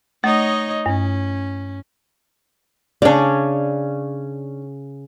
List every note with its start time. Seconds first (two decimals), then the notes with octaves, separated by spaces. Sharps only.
0.24 A3 D#4 C#5 D#5
0.86 G2 C#4
3.02 C#3 C#4 D4 D5